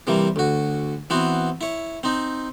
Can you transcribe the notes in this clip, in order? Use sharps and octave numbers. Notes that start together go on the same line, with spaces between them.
C3 E3 G3 A#3
D2 F#4
E3 B3 C4 F#4
E4 C#5
C4 D#4